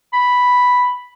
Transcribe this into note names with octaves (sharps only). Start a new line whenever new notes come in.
B5